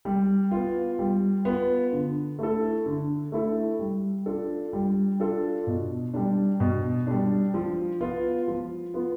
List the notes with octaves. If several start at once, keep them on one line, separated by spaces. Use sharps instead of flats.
G3
B3 F4
G3
B3 F4
D3
A3 E4 A4
D3
A3 E4 A4
G3
D4 F4 A4
G3
D4 F4 A4
B2
G3 D4
B2
G3 D4
F3
B3 F4
F3
B3 F4